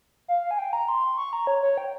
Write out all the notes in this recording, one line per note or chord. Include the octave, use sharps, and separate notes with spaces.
F5
G#5
G5
A#5
C6
C#6
A#5
C#5
C#5
G5